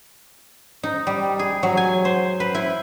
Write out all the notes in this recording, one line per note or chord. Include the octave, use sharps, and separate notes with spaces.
D#4
G3
G#4
F#3
G#5
C5
B4
E4